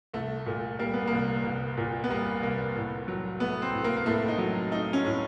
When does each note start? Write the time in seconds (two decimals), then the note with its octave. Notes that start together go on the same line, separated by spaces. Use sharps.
0.14 C2 A3
0.46 A#2
0.79 G3 A#3
0.94 B3
1.08 C2 A#3
1.44 C2
1.77 A#2
2.04 B3
2.10 G3 A#3
2.42 C2 A#3
2.75 A2
3.08 F#3
3.40 A3 B3
3.62 C4
3.73 A2
3.84 A#3
3.97 A#3
4.06 A2 A3
4.28 D#4
4.38 F#3
4.71 A3 D#4
4.93 C#4
5.04 A2